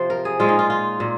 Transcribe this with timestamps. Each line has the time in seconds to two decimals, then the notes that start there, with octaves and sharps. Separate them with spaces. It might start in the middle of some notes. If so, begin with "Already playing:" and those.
Already playing: C3 F3 C5
0.10 A#4
0.25 G#4
0.39 A#2 G#3 F4
0.49 D#4
0.59 F4
0.70 F4
1.00 A#2